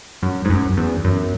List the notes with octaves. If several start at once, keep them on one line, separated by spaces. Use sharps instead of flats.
F#2
G#2
F#2
E2
F#2